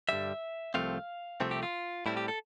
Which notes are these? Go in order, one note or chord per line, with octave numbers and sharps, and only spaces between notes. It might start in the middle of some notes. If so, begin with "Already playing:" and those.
G2 D3 G3 E5
C2 A#2 F3 A3 C4 F5
C2 C3 F3 A3 C4
G4
F4
A2 G3 C4 E4
G4
A4